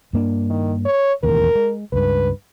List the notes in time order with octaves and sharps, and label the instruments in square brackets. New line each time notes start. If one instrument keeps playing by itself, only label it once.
[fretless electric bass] G2 A#3 D4
[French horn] D#3
C#5
[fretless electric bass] E1 A1 D#2 [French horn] A#4
[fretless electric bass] G#3
[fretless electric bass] C#2 G2 [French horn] B4